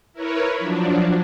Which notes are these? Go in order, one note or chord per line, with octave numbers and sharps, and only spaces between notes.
E4 A#4 B4 C#5
F3 F#3 D4